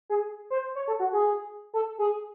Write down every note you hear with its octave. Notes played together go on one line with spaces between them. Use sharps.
G#4
C5
C#5
A4
F#4
G#4
A4
G#4